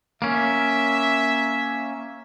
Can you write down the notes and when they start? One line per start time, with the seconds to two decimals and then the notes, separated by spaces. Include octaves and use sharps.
0.22 A#3 C#4 E5